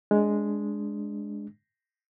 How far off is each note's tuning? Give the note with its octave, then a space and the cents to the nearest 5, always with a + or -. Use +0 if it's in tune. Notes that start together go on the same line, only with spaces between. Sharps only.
G#3 +0 D4 -10